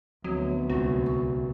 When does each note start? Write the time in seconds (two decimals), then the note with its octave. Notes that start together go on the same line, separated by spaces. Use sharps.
0.24 D2 F3 F#3 B3 C4 F#4
0.69 C2 A#2 F#3 G#3 C4 F4 F#4
1.06 C#6